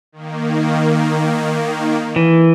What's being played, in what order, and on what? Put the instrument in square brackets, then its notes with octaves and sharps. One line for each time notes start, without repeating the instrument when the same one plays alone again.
[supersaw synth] D#3 A#3
[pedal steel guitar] E3